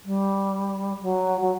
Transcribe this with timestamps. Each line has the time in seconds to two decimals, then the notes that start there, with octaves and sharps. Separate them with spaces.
0.05 G3
1.03 F#3
1.41 F#3